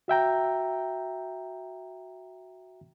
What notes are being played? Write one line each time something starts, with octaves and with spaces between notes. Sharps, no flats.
F#4 E5 G5 A#5